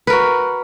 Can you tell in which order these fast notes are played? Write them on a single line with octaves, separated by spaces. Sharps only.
B4 A#4 F#4